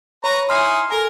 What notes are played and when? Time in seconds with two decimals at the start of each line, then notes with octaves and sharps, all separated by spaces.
0.24 B4 C#5 A#5 C#6
0.49 D#4 E4 G#4 C6 F6 C7
0.90 A4 A#4 G#5 A#5